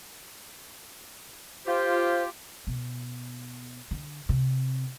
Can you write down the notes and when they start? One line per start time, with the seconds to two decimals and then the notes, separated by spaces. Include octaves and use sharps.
1.66 F4 G4 C5
2.67 B2
3.91 D3
4.29 C3